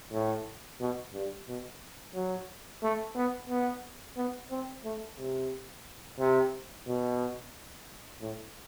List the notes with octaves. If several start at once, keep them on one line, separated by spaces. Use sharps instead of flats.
A2
B2
G2
B2
F#3
A3
B3
B3
B3
C4
A3
C3
C3
B2
A2